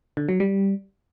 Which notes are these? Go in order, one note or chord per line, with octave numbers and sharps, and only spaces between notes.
D3
F#3
G3